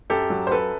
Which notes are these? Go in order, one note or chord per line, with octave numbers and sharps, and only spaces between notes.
F#2 G4 A4
F#3
C5
F#2 A4 B4